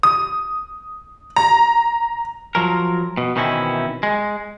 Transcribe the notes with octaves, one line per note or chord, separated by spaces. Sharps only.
D#6
A#5
F3 F#3 A#4
B2
B2 D#3 E3 C4 C#4 E4
G#3